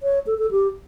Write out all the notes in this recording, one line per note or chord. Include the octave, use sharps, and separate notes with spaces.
C#5
A4
A4
G4